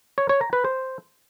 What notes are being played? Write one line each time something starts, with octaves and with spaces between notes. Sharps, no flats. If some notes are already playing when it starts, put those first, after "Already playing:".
C#5
C#5
A#5
B4
C5